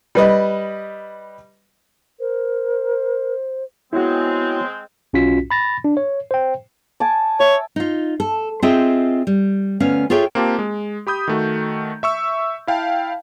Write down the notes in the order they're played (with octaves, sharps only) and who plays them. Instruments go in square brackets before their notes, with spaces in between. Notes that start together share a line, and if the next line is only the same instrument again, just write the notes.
[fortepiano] G3 B4 D#5
[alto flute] A#4 [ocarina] C5
[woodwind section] G#3 C4 [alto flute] B3 [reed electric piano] E4 F#4 [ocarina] C#5
[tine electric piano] B1 C#4 F4 F#4 B6
B5 A6 A#6
D4
C#5
C5 G5
[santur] G#5 A5 D6
[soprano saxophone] C#5 [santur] E5
[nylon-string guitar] D#4 F4
A4
C4 F4 G#4 D#5 E5 G5
G3
D2 B3 C#4 F5
F4 G#4 A4 C#5 E5 G5
[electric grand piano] A#3 C4 F4 G4 A5
G#3
G4 B5 D#6 G6
D#3 A3 F#4
E5 C#6 E6
E4 F5 G5 A5